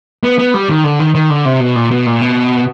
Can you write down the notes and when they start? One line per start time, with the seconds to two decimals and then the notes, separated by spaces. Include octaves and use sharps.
0.23 B3
0.39 B3
0.54 G3
0.69 D#3
0.84 D3
0.99 D#3
1.15 D#3
1.30 D3
1.45 C3
1.60 B2
1.75 A#2
1.91 B2
2.06 A#2
2.21 B2